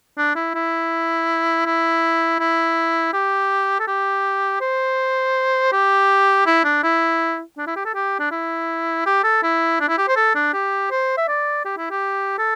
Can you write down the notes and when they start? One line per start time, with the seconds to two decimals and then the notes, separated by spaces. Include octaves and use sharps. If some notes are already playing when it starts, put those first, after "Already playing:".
0.18 D4
0.36 E4
0.55 E4
1.66 E4
2.40 E4
3.14 G4
3.80 A4
3.88 G4
4.61 C5
5.73 G4
6.47 E4
6.65 D4
6.84 E4
7.58 D4
7.67 E4
7.76 G4
7.85 A4
7.95 G4
8.20 D4
8.31 E4
9.06 G4
9.24 A4
9.43 E4
9.80 D4
9.89 E4
9.98 G4
10.08 C5
10.16 A4
10.35 D4
10.54 G4
10.91 C5
11.18 E5
11.28 D5
11.65 G4
11.78 E4
11.91 G4
12.39 A4